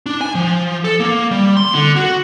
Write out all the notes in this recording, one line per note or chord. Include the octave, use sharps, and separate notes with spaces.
D4
G#5
F3
A4
A#3
G3
C6
D3
F#4